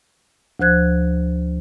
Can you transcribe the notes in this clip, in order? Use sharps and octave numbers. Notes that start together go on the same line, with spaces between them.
D2 F3 C5 F#6 G#6